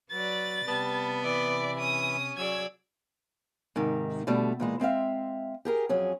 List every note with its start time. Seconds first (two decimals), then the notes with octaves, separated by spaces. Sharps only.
0.11 F#3 B4 D5 A6
0.68 C3 G3 B3 A5
1.24 E3 D5 E5 B5
1.79 C#4 D#6
2.37 F#3 G#4 D5 E6 G#6
3.76 G#2 C3 D#3
4.27 B2 D3 G3 A3
4.60 A#2 E3 G#3
4.80 G#3 C4 E5 F5
5.65 G4 G#4 A#4
5.89 F2 F#3 C#4 G#4